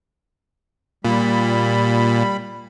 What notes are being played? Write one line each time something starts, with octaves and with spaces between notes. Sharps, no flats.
A#2 G3 B5